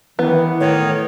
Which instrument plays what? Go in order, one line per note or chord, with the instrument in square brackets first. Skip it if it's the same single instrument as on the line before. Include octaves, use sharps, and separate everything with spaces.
[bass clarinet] D#3 [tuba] E3 [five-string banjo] B3
[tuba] A2 [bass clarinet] D#3 [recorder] C#5